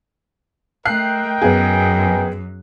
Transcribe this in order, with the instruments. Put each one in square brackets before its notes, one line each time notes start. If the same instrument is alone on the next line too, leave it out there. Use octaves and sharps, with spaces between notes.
[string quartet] A3 [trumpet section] A#4 D#5 G5 [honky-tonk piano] F#6 C7
[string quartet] F#2 [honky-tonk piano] B3 G#4